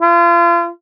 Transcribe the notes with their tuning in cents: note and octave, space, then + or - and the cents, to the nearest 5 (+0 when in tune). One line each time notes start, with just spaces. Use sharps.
F4 -35